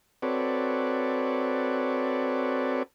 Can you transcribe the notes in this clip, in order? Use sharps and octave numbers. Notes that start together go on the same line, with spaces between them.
C4 F#4 A4 B4 C#5 D5